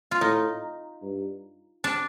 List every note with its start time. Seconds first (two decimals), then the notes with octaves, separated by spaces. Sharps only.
0.11 F4
0.20 A2 D#4
1.02 G2
1.84 D4